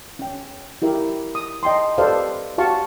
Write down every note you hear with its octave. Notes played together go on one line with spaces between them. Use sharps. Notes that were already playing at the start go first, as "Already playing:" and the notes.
C#4 G5
E4 G4 A#4 E5
D#6
D#5 G5 A5 C6
G4 A4 B4 C5 D5 F5
F#4 G4 F5 A5 C#6